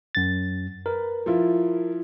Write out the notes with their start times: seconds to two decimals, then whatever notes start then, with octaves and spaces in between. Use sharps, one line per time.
0.15 F#2 A6
0.86 A#4 B4
1.26 F3 E4 F4